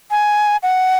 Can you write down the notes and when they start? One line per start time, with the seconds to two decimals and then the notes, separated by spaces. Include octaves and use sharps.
0.11 G#5
0.63 F#5